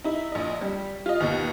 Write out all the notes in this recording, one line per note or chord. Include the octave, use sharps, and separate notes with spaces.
D#4 E4
A#1 D#5
G3
F4 D#5
D#2 B2